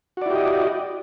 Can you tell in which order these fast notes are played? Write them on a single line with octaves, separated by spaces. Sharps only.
F#4 D5 E4 G4 D#5